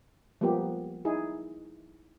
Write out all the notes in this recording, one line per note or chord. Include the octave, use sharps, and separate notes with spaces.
F3 G3 G#3 A#3 B3 G4
D#4 E4 G#4